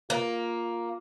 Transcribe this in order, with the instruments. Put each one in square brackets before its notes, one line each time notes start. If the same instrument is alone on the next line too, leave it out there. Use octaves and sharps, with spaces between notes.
[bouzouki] A#3 [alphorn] F4